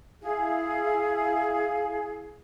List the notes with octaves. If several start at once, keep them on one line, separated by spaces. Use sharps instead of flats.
E4 G#4 F5